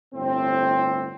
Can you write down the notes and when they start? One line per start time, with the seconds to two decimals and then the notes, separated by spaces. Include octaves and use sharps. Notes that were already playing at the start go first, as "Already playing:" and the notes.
0.14 G1 A2 C4